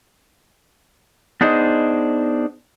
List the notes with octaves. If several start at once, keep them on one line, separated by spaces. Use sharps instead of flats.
B3 D4 D#4 G#4 C5 D#5